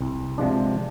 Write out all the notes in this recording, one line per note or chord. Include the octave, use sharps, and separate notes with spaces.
C2
C3 F3 G#3 D4